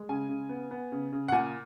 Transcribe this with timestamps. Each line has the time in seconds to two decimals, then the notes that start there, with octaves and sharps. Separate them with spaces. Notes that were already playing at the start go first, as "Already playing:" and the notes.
Already playing: G#3
0.09 C#3 G#5
0.29 C#3
0.49 B3
0.71 B3
0.92 C#3
1.12 C#3
1.28 F#5
1.32 A#2 G#5